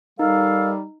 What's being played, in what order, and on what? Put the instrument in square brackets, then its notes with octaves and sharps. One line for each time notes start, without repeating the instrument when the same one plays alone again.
[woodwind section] D#3 A4 F5 [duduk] G3 [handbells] D#4